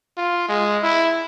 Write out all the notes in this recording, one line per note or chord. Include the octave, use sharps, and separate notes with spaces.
F4
G#3
E4